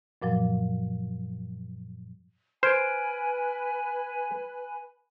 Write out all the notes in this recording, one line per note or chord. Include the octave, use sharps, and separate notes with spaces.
F#2 A#2 F3 F#3
B4 C5 G#5 B5 F6 G#6 D7